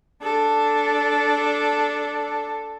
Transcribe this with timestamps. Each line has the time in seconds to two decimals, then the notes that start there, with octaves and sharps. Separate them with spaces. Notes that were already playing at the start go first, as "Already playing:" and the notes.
0.23 D4 A4